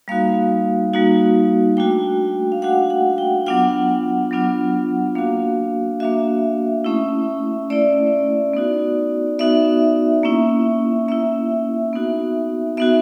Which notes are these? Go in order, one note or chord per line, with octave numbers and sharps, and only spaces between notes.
G3 A#3 D#4 F#4 F5
G3 A#3 D#4 F#4
A3 D4 F#4 G5
F5
A3 D4 F#4 F#5
F#5
G5
F#3 B3 D4 F4 F#5
F#3 B3 D4 F4
A#3 D4 F#4 F5
A#3 D4 F#4 E5
A3 C#4 E4
A3 C#4 E4 D5
B3 D#4 F#4
B3 D#4 F#4 E5
A#3 C#4 E4
A#3 C#4 E4 E5
B3 D#4 F#4
B3 D#4 F#4 E5